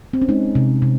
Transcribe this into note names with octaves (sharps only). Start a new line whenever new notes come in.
C4
C#4
G#3 D#4
C3
C3